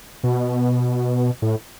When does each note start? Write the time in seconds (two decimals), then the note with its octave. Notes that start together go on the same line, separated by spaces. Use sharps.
0.23 B2
1.42 A2